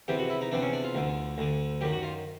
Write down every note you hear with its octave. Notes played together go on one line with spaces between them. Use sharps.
E2 C3 E3 G4
F#4
E4
D#4
E2 C3 E3 D4
C#4
D4
F4
D2 D3
D2 D3
F#2 D#3 G4
F#4
F4